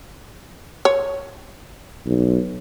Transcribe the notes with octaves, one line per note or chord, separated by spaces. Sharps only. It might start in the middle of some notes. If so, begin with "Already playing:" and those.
C#5
B1